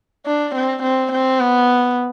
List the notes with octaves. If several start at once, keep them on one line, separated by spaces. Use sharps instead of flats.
D4
C4
C4
C4
B3